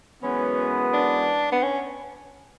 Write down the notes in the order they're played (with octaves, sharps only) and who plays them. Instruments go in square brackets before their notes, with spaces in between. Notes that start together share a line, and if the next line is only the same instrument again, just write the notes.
[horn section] F#2 E3 G#3 B3 [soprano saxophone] C#4
[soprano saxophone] D4
B3
C#4